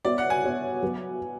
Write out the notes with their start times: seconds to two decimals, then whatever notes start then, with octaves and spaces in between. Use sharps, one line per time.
0.05 B3 F#4 C#5 D5 E5
0.18 F#5
0.30 G#5
0.43 B3 F#4 C#5 E5
0.82 F#3 B3 F#4 B4